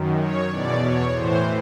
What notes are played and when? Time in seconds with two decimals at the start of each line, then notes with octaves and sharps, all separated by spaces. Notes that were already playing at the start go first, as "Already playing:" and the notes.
Already playing: F#2 D#3
0.19 C#5
0.51 E2 B2 D5
0.83 C#5
1.15 A2 E3 C5